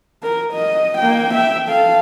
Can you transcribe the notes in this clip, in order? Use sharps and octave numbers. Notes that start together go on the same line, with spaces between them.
A#4
D#5
A#3 G5
E5 G5
A4 F5